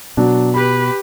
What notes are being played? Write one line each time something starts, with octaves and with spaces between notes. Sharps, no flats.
B2 F#3 D4
G4 B4 B5